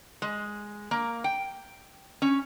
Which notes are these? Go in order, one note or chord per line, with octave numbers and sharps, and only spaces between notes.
G#3
A#3
G5
C#4